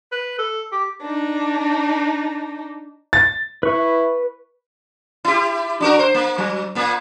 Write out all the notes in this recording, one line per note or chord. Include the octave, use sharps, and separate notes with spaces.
B4
A4
G4
D4 D#4
A6
E4 B4 C#6
E4 G4
D4 F#4 A#4
C5
A#3
F#3
A#2 A#3